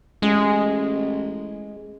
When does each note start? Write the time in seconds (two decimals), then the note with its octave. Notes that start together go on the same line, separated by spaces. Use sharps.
0.22 A1 G#3